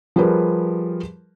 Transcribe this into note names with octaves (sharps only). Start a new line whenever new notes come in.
F3 G3 G4 G#4 A#4 B4